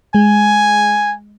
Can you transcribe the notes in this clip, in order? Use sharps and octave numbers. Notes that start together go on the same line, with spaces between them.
G#3 G#5